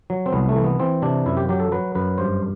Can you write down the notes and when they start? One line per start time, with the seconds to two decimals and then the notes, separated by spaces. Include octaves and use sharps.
0.10 F#3
0.26 C4
0.32 C2 B3
0.49 A3
0.56 E3
0.64 B3
0.80 E3 C4
1.02 C3 D4
1.26 F#2 E4
1.37 G4
1.49 F#3 G4
1.60 A4
1.72 F#3 B4
1.95 F#2 B4
2.18 G2 C5